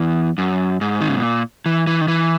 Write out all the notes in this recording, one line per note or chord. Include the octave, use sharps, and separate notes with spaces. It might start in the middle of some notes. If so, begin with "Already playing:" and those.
Already playing: E2
F#2
G#2
D#3
C#3
B2
A#2
E3
E3
D#3
E3